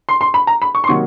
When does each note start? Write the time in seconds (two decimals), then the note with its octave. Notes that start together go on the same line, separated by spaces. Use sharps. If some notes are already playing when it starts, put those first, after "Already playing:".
0.09 C6
0.21 C6
0.34 B5
0.47 A#5
0.62 B5
0.75 C#6
0.84 C6
0.87 C3 D#3 F#3 A#3 C#6